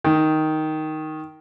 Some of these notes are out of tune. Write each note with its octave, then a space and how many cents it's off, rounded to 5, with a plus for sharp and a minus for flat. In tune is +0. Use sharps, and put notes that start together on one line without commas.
D#3 +5